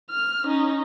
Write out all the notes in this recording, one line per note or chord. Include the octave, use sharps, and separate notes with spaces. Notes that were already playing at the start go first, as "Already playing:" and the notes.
F6
C#4 D#4